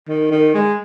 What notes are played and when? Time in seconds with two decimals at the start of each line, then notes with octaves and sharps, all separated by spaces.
0.08 D#3
0.31 D#3
0.54 G#3